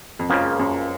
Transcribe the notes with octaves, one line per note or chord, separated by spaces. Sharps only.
F2
C#2 F#2 C#3 F3 A#3
F#2